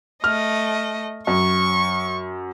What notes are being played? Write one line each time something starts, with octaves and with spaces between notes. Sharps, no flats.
A3 D#5 F6
F#2 C#6